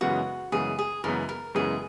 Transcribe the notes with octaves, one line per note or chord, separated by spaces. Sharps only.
F#2 C#3 E3 G#3 B3 F#4
F#2 C#3 E3 G#3 B3 G#4
G#4
F#2 C#3 E3 G#3 B3 A#4
A#4
F#2 C#3 E3 G#3 B3 G#4